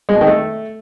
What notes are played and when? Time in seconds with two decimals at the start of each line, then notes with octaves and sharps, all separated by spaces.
0.09 G#3
0.15 B2
0.21 D#3
0.27 A3